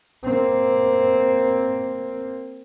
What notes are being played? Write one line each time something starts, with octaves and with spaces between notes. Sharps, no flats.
A#3 C4